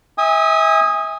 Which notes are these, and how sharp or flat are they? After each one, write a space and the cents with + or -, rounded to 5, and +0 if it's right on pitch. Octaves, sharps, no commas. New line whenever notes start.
E5 -35 G#5 -30 D#6 +0